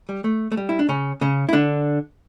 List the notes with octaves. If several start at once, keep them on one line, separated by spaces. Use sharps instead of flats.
G3
A3
A3
G3
E4
D4
C#3 C#4
C#3 C#4
E4
D3 D4